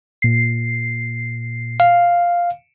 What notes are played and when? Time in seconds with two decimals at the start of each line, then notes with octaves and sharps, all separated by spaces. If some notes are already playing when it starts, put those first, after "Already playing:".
0.22 A#2 C7
1.80 F5